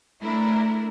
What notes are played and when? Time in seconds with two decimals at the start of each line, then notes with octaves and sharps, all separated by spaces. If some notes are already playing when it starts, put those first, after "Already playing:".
0.23 A3 D4 E4 A#4